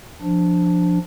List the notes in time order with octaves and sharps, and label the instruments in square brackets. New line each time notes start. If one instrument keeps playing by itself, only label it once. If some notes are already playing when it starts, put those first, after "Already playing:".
[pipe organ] F3 D4